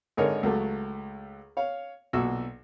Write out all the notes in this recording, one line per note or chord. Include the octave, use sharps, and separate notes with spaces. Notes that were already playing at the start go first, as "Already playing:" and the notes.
G#1 D3 D#4 G#4 A#4 C#5
C#2 F#3 A3
C#5 F5
B1 A#2 F#4 E6